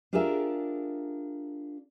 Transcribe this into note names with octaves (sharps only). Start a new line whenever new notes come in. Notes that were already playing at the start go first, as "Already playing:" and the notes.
D4 F4 G4 G#4 A#4 E5